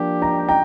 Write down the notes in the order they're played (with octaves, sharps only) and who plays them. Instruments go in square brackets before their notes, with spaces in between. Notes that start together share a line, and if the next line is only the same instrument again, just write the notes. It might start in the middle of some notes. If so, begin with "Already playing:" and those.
Already playing: [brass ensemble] F3 A#3 D4 G4
[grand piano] G5 A#5
G5 A#5